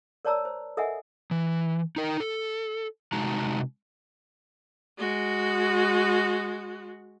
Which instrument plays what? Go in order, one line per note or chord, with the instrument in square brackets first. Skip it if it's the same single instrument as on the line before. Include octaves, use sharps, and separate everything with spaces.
[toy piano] A#4 C#5 D5 A5 A#5 E6
C5
A4 A#4 D#5 E5 F#5 G#5
[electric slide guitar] E3
D#4 A#4
A4
C3 G#3 D#4 F#4 A5 A#5
[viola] G#3 F#4